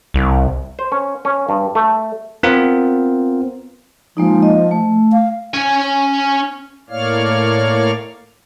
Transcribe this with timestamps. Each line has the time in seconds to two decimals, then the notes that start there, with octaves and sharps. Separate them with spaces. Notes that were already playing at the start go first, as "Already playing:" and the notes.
0.14 C2
0.79 C5
0.92 C#4
1.25 C#4
1.49 G2
1.75 A3
2.43 B3 C4 F4 A#4
4.17 F3 G#3 A#3 D#4
4.43 D#5
4.71 A3
5.12 F5
5.54 C#4 G#5
6.90 A2 A#3 C#5 D5 F5 F6